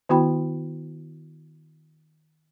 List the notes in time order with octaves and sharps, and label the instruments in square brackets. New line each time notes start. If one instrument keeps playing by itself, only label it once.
[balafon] D#3 B3 E4 F#4 G5 B5